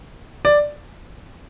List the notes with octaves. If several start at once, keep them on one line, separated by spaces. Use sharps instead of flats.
D5